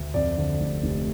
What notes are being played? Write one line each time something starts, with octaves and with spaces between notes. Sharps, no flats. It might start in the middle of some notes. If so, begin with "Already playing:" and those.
Already playing: D2
F2 D5
D3
F1
F1